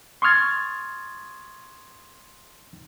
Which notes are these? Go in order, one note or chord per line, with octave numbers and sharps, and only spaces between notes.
C6 C#6 D#6 F6 G#6 A6